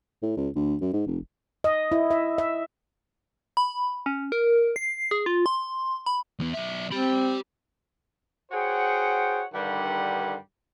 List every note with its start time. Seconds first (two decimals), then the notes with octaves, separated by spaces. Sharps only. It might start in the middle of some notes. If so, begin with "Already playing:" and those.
0.23 A2
0.37 C#2
0.55 D2
0.81 F#2
0.93 G#2
1.07 F1
1.64 D#5
1.92 E4
2.11 E5
2.38 E5
3.57 B5
4.06 C#4
4.32 A#4
4.76 C7
5.11 G#4
5.26 F4
5.46 C6
6.06 B5
6.39 E2 B3
6.53 B1 E5
6.91 C4 G4 B5
8.52 F#4 G#4 C5 C#5 F#5 G5
9.54 G2 D3 D#3 G3 B4 F#5